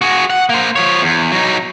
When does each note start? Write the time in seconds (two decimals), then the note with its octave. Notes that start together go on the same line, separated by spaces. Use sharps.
0.02 F#4 G#4
0.30 F#5
0.50 A#3 C5
0.76 F3 C#5
1.02 E2
1.32 F#3 D#4